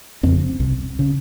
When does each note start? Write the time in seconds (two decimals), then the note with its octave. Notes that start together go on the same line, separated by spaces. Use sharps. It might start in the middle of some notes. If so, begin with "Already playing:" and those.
0.23 F2 C#3 C4
0.60 C2 C3
0.99 C#3